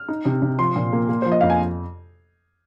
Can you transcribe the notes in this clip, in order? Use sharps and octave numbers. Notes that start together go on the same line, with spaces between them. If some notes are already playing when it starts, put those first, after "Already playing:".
Already playing: F6
D#4
C3
C3
F3 C6
A#2
A#3
A#3
F3 C5
D#5
F2 F5
G#5